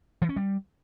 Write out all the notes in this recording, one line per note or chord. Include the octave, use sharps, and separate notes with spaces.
E3
C#4
G3